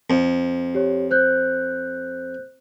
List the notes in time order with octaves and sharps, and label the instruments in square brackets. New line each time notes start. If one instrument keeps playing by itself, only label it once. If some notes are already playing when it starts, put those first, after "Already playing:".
[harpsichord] F2
[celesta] G4 C#5
C5 F#6 G6